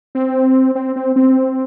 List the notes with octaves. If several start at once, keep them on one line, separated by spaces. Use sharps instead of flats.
C4
C4
C4
C4